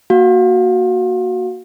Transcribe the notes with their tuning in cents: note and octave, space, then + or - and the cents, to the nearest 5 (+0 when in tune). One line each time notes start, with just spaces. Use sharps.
A#3 +0 F#4 +0 F5 +20